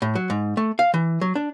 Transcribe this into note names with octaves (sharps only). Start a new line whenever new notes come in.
A2
F#3
G#2
A3
F5
E3
F#3
D4